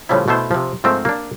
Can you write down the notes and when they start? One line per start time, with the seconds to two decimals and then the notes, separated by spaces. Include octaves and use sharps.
0.09 A2 C#3 F3 G3 E4
0.28 B2 A3 B3 E4 C5
0.51 C3 F3
0.84 G#2 F3 A3 C4 A#4
1.05 A#3 D4